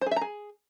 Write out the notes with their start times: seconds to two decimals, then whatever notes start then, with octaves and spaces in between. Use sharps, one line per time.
0.01 C5
0.06 G#4
0.11 E5
0.16 A#5
0.21 G#4